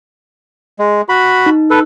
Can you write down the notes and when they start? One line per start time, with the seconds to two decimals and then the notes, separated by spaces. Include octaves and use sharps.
0.79 G#3
1.09 F#4 B5
1.46 D#4
1.70 A4 B4